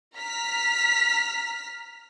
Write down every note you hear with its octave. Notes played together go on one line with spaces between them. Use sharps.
A#5 F6 B6